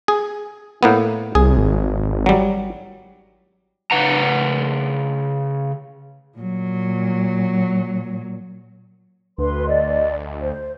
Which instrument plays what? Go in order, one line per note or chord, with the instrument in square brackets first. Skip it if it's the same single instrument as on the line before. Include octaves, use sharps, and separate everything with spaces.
[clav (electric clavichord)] G#4
A2 A#3 B3
[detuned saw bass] C2 [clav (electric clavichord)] G#4
[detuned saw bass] G#1
[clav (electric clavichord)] F#3 G3
[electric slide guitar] C#3 B4 F#5 A#5
[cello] A#2 F#3
[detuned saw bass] D2 [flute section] B4 C6
[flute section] D5 D#5
C5